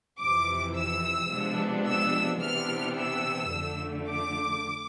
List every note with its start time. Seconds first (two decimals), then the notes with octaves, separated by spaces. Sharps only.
0.20 F2 C3 E3 D6
0.76 E6
1.31 C3 F3 G#3 B3 D4
1.86 E6
2.42 C3 E3 B3 D4 F6
2.98 E6
3.53 F2 D3 A3
4.09 D6